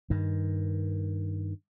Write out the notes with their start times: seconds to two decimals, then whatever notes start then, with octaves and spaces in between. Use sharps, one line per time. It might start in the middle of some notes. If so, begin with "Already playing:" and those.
0.10 G2 D#3